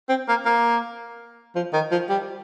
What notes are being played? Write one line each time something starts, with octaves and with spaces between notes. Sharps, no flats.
C4
A#3
A#3
F3
D#3
F3
G3